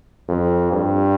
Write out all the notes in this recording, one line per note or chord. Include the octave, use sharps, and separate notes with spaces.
F2
G2